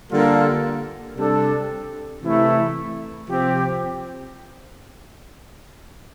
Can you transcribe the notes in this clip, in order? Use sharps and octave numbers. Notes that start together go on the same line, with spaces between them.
D3 G3 A#3 F4 A4
C3 G3 D4 A4
C3 E3 A3 E4
C3 F3 C4 G4